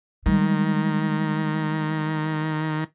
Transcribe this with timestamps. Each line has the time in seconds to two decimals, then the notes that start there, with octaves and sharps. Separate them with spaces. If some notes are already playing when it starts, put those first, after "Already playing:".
0.26 D#3 G3 G#3